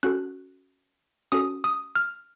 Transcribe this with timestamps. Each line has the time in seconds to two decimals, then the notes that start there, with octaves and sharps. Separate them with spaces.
0.03 C#4 F#4 A4 F#6
1.32 C#4 F#4 A4 D#6
1.64 D#6
1.95 F6